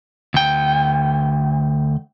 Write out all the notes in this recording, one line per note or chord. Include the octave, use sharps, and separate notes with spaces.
D2 G5